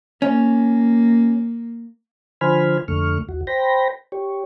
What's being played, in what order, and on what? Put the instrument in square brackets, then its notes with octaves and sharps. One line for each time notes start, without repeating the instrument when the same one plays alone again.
[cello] A#3 [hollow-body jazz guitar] C#4
[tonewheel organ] D3 F3 C5 G#5 B5 F6
F2 D3 A3 C#6 F6
D#2 F#4
C5 G5 B5 A#6
G4 C#5